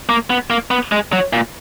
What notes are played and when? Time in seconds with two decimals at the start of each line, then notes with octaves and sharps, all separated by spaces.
0.09 A#3
0.30 B3
0.50 A#3
0.71 B3
0.92 G#3
1.13 F#3
1.33 A#2